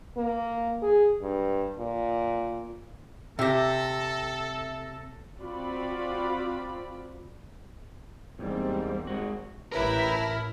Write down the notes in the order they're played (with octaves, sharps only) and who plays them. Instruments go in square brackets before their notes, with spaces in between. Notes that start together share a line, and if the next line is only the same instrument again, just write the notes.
[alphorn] A#3
G#4
G2
A#2
[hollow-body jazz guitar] C3 G4 [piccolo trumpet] A4 [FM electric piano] E5 E6 A#6
[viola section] C4 F4 F#4 D5 B5
[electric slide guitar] E2 [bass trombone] G#2 [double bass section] G3 A#3 C4
[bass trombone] G#1 [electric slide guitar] G#3 F#4
[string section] A1 E4 [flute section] G4 B4 [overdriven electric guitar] A#4
[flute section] A5